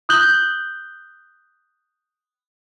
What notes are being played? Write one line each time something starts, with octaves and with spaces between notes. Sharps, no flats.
D#6 F#6 G6 F#7 G7